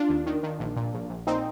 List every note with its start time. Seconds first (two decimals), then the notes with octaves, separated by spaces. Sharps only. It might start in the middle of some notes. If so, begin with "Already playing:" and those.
Already playing: D4 F4
0.09 D#2
0.26 D#3
0.43 D#3
0.60 A#1
0.76 A#2
0.94 A#1
1.09 A#1
1.27 A#2 C4 D#4